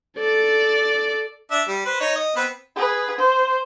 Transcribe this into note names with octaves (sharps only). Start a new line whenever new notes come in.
A4 D5
D4 E5
G3
B4 C5
D#4 C#5
D#5
B3 C4 B4
G#4 B4
C5